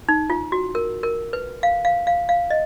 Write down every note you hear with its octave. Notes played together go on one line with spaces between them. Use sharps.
D#4
F4
F#4
A#4
A#4
B4
F5
F5
F5
F5
D#5